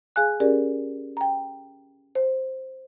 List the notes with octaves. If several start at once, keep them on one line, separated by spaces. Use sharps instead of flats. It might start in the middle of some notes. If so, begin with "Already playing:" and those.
G#4 F5 G#5 F#6
C#4 G4 G#4 A#4 D5
G5 A#5
C5